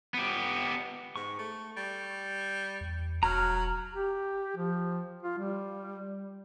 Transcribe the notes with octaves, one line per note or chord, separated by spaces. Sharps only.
B3 G4
G#2 C#6
A3
G3
E2
E1 F#3 A#5 F6
G4
F3
F4
G3